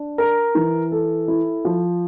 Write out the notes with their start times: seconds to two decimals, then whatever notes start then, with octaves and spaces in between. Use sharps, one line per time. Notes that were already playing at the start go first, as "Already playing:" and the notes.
Already playing: D4
0.18 A#4
0.55 E3
0.92 A4
1.28 E4
1.65 F3